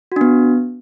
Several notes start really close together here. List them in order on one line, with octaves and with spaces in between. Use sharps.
F#4 D4 B3